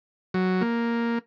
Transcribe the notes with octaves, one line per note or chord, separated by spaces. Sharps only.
F#3
A#3